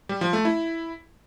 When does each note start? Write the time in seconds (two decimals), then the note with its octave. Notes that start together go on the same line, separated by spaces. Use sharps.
0.09 G3
0.21 F3
0.33 A3
0.45 E4